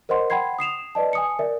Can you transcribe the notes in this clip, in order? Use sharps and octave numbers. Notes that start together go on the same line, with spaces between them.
A#4 C5 D#5 F#5 C6
F#5 G5 B5 C6 G#6 C7
D#6 C7 E7 F7
B4 D5 D#5 A5
G#5 D#6 C#7
A#4 D5 E5